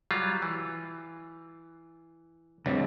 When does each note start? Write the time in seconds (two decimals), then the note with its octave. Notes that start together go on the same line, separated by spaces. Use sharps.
0.11 F#3 G3 F4
0.42 E3
2.66 C#2 D3 G3 C4